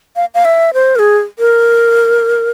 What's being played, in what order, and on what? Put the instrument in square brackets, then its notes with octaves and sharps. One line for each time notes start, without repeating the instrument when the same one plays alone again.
[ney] F5
F5
E5
C5
A#4
G#4
A#4